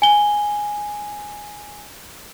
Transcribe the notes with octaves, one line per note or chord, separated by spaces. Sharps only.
G#5 G7